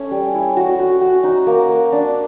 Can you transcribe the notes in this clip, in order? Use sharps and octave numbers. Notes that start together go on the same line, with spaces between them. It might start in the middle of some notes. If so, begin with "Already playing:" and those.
Already playing: A3 C#4
G3
E4
F#4
F#4
F#4
D#4
A#3
A#3
D4